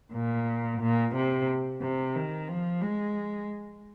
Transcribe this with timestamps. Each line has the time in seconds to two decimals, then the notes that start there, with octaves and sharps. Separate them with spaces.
0.14 A#2
0.81 A#2
1.15 C3
1.81 C3
2.15 D#3
2.48 F3
2.82 G#3